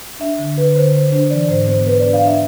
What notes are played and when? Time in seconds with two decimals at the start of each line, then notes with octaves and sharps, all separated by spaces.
0.20 D4 E5
0.39 D3
0.58 D3 B4
0.76 D3 C5
0.94 D3 C5
1.12 D4 C5
1.30 E3 D5
1.49 G#2 C5
1.67 B3 C5
1.86 B3 B4
2.00 D4 D5
2.13 F5
2.23 D4 E5